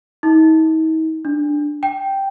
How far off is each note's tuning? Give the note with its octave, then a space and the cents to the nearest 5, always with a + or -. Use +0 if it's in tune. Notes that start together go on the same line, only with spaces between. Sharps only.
D#4 +45
D4 +5
G5 -5